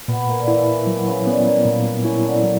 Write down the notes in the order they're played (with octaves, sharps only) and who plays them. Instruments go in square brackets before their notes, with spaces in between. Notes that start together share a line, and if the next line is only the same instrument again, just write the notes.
[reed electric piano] A#2 [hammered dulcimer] B3
[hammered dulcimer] A#3
D3
[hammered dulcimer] E3 [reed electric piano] E4
[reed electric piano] F#3
[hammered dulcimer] B2
C#3
[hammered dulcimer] G3 [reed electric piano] B3
[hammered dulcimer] G3
A#3
[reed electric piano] A#2 [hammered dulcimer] A#3
[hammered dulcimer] C#4 [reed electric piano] E4
[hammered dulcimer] D3
[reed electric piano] F#3